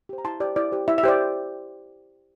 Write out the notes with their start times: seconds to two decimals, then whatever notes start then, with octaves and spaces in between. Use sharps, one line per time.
0.09 G4 C5
0.18 A#5
0.25 E4 A5 C6
0.40 G4 C5 D5
0.56 E4 D5
0.72 G4 C5
0.88 E4 E5
0.98 E5
1.03 G4 C5 D5